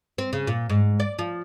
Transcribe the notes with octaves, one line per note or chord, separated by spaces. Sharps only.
C4
C#3
A#2
G#2
D5
F3